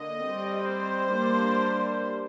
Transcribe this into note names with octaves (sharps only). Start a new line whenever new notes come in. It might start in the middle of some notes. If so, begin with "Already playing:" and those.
Already playing: D3 A#3 D#5
G3 C4
C5
G3 A#3 D4